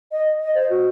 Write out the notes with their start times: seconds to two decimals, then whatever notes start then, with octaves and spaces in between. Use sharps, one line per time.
0.11 D#5
0.40 D#5
0.55 C5
0.69 F#4